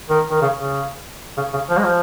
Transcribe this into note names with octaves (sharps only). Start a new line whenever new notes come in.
D#3
D#3
C#3
C#3
C#3
C#3
F3
G#3
F3